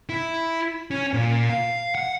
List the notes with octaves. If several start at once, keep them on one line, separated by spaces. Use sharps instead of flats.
E4
C#4
A#2
F5
F#5